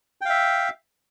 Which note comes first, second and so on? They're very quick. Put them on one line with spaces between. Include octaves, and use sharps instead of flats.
G5 F5 E5